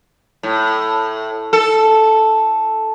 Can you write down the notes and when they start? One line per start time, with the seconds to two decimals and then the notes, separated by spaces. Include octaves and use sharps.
0.43 A2
1.53 A4